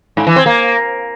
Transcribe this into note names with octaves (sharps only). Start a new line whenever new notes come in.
G#2
E3
C4
A#3